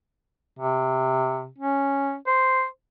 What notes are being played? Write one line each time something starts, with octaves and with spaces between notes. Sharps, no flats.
C3
C#4
C5